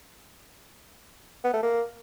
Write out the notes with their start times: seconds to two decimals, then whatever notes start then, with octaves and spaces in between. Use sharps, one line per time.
1.44 B3
1.53 A3
1.63 A#3